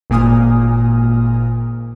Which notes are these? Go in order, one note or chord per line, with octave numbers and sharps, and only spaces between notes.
G#1 A#2 A#3 G#5 D#6 F6